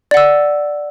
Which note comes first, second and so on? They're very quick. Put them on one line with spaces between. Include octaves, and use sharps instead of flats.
D5 F#5 E6